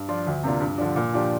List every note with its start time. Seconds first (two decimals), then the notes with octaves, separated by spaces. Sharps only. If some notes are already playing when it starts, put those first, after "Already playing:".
Already playing: G2
0.08 F3 D4 F4
0.27 D2
0.44 C3 A#3 D4 F4
0.60 G2
0.78 D3 F3 D4
0.96 A#2
1.13 F3 D4 G4